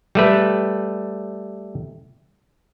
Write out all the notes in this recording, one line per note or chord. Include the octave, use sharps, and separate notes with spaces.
G3 A3 B4